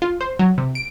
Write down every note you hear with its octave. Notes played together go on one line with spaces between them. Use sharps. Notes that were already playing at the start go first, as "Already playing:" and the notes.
F4
C5
F#3
C3
D7